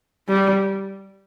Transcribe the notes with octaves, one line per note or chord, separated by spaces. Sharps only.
G3